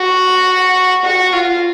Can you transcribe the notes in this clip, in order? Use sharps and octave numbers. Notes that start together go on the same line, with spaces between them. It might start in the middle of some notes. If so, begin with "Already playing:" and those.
Already playing: F#4
F#4
F4